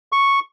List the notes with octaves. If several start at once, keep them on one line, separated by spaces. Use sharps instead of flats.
C#6